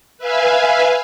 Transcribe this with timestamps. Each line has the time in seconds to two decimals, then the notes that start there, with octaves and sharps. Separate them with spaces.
0.18 B4 E5 F5 G#5